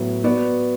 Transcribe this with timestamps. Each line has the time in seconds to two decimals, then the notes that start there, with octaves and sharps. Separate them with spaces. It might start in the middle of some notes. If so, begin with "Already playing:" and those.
Already playing: A2 F#3 B3
0.24 B3 F#4 B4 D5